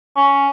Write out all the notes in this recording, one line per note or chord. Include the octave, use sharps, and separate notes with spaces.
C#4